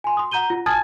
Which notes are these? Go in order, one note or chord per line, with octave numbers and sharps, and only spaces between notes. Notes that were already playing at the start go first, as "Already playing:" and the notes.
G#5 C6
C6 D#6
F#5 A#5 G6 D#7 G7
F4
G#5 A5 D#6 F6 G#6 A6